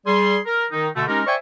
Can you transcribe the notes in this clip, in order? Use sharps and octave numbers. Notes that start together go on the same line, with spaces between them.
G3 G#4 C6
A#4
D#3 D#4
B2 D3 A3
G#3 C#4 D#4 G4 A#4
C5 D5 E5 G5 G#5 C#6